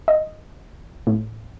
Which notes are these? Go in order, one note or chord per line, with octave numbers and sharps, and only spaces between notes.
D#5
A2